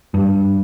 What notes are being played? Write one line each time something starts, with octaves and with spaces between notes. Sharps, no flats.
G2